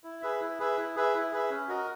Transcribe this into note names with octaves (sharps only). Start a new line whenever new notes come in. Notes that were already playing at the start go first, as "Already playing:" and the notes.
E4
G#4 B4 E5
E4
G#4 B4 E5
E4
G#4 B4 E5
E4
G#4 B4 E5
C#4
F#4 A#4 D#5